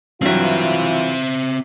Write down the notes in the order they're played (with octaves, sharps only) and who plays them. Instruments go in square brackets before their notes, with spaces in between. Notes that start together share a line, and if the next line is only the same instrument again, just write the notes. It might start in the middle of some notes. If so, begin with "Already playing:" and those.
[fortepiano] G2 F#3 [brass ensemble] E3 F4 [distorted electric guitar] C4 E5